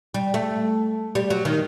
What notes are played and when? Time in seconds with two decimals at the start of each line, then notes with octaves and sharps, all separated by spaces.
0.14 G3
0.34 A3
1.15 G3
1.30 F#3
1.45 D#3